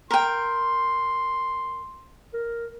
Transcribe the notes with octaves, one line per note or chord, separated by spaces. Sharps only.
A#4 G5 C6
A#4